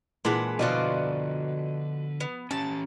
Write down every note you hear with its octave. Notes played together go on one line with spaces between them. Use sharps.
A#2 E3 G#3 D4 B4 F#5
B2 D3 F3 F4 F#4 B4 D5 D#5
B3
C#4 G4 A5